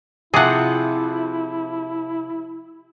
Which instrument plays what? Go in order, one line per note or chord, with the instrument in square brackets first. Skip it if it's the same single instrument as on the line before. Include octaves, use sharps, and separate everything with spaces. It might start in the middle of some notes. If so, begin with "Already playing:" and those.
[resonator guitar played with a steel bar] C3 F3 F4 [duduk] E4 [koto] G#4 F#5